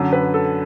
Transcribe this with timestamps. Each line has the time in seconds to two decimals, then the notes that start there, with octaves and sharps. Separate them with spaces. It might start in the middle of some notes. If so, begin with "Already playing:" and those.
Already playing: F#2 D3
0.13 B4
0.34 A4